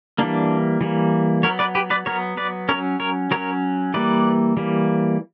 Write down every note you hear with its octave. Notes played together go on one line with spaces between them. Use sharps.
E3 G3 A#3 D4
E3 G3 A#3
F#3 B3 A#4 C#5
B4 D5
G4 B4
B4 D5
F#3 B3 A#4 C#5
B4 D5
F#3 C#4 A#4 C#5
A#4 C#5
F#3 C#4 A#4 C#5
E3 G3 A#3 B4 D5
E3 G3 A#3